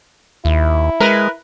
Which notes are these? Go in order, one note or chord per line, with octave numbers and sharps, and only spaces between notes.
D#2 E4
G#3 A#4 B4